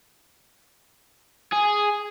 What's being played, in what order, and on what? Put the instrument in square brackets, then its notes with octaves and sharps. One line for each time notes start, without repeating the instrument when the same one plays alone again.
[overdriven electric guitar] G#4